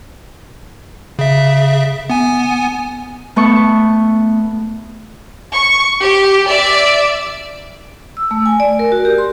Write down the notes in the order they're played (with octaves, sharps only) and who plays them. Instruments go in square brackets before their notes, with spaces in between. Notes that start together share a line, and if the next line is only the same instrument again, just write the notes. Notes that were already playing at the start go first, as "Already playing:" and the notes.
[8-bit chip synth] C#3 E5
B3 G#5
[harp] A3 B3 A5 C#6
[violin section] C#6
G4
D5 E5
[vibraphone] E6
A3
G#5
D5
A#4
F#4
G4
C6